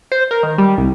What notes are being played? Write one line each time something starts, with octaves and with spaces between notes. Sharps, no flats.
C5
A#4
D#3
G3
C2